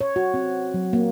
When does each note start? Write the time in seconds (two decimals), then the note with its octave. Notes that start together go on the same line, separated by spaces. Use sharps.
0.01 C#5
0.16 F#4
0.34 C4
0.74 F#3
0.93 A#3